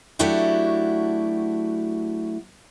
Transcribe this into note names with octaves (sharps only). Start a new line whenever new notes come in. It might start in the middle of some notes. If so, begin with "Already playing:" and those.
F#3 A3 D4 E4 F#4 G4